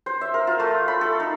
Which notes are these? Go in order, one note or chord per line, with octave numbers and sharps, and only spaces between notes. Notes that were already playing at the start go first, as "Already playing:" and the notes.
C5
E5
A#4
F4
A3
B5
A4
D#4